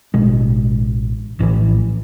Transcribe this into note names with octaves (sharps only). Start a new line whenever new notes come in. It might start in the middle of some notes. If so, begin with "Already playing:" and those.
A1 B2 G#3
A#1 A2 C#3 E3